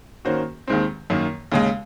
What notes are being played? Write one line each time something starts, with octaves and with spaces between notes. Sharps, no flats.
D#3 A#3 C#4 F#4 C5
D#2 D#3 G#3 C4
F#2 D#3 A#3
D#2 C#3 G#3